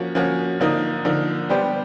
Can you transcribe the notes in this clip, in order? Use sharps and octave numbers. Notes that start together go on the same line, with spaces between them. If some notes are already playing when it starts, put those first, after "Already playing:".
Already playing: F3 A#3 C#4 F#4
F3 A#3 C#4 F#4
D3 F3 A#3 D#4
D3 F3 A#3 D#4
G3 B3 D4 G4 C5